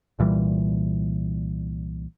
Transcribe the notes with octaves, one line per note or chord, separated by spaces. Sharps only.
C2 A#2 E3 G3